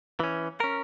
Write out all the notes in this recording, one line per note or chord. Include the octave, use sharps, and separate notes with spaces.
E3 C#4
C#4 A#4